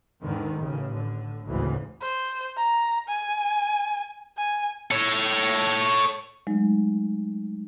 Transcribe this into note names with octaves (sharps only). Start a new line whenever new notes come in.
E2 G#2 D3 D#3
A1 A2 C#3
A2 D3
G#1 D2 A2 C#3 E3
C5
A#5
G#5
G#5
A4 C#5
F#3 G#3 A3 D#4